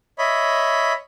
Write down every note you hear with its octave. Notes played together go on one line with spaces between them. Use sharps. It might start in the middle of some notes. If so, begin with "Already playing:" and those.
C#5 D#5 E5 B5